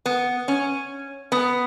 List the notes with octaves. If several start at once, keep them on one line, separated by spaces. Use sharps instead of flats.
B3
C#4
B3